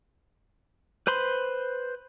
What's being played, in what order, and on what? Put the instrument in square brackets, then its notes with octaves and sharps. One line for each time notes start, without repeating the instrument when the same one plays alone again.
[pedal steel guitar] B4 C5 B5 C6